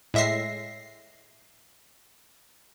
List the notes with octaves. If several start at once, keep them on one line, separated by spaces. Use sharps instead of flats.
A2 G#3 E5 A#6 C7